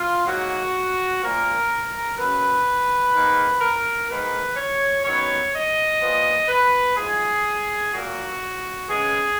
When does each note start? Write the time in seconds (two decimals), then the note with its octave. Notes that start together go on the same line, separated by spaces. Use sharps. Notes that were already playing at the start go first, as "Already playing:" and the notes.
Already playing: F4
0.26 G#2 F#3 A#3 F#4
1.22 A#2 F3 A#3 A#4
2.17 F#2 C#3 F#3 B4
3.14 G#2 D#3 A#3
3.61 A#4
4.09 G#2 D#3 A#3 B4
4.56 C#5
5.04 F#2 D#3 F#3 B3 C#5
5.52 D#5
6.00 A#2 F3 B3
6.49 B4
6.96 G#2 F3 G#3 G#4
7.92 A#2 F#3 A#3 F#4
8.88 C#3 G#3 B3 G#4